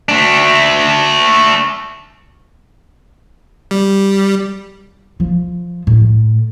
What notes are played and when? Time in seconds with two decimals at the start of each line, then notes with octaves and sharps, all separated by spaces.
0.09 A3 D4
3.71 G3
5.20 F3
5.87 A2